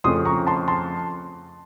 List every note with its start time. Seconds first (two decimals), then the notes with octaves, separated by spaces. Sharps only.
0.04 F2 C#3 F3 A3 C#4 C6 D#6
0.25 A#5 C#6
0.47 A5 C6
0.68 A5 C6